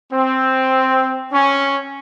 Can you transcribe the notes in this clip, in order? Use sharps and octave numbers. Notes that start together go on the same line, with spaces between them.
C4
C#4